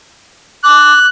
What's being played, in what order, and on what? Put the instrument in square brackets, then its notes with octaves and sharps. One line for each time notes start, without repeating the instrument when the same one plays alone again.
[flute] D6 [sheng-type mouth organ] F#6